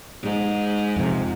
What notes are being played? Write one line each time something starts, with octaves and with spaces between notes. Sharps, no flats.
G#2
F2 C3